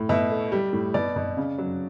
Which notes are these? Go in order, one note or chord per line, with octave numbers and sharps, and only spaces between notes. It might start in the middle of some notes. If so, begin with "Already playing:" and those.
Already playing: A2
B2 E5
A3
G3
A2
B2 D5
B2
C#3
F#3